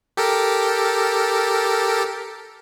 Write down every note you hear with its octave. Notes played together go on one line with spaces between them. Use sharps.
G4 A4 A#4